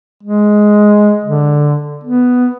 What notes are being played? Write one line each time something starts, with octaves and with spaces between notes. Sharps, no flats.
G#3
D3
B3